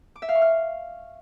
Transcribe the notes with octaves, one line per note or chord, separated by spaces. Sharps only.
D6
E5
F5
C#6
F6